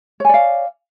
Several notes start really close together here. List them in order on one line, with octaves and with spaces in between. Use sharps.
C#5 G#5 D5 F5